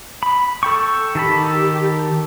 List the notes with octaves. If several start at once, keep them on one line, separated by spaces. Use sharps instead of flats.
B5
A4 G5 C#6
D#3 G4 A4 B5